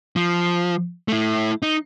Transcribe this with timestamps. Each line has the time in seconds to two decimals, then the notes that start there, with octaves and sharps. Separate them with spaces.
0.16 F3
1.08 A3 E4
1.62 D#4